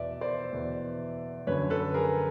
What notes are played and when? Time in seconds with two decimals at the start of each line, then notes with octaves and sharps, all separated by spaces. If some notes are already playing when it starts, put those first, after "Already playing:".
Already playing: E2 B2 D5 E5
0.21 C5 D5
0.53 E2 B2
1.47 F#2 D3 B4 C#5
1.70 A4 B4
1.94 G#4 A#4